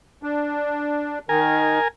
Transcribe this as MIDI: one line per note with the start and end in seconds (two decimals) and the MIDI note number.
0.23 1.19 62
1.29 1.79 51
1.29 1.88 70
1.29 1.88 80